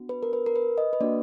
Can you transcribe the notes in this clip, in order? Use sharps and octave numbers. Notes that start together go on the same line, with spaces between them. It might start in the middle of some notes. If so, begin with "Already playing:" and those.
Already playing: B3 D4 F#4
B4
A#4
B4
A#4
B4
D#5
B4
A#3 D4 F#4 D5